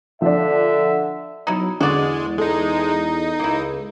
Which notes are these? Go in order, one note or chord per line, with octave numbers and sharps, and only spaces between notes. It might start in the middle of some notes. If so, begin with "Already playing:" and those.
D3 F3 D4 E5
B2 F#3 D#4 E4
E2 D3 G#3 F#4 D5 D#5
G#3 D#4 A4
D#4
C#2 A#3 E4